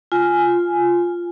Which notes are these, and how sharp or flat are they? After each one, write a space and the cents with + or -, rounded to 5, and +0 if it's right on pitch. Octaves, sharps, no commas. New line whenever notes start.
F4 +0 G#5 +0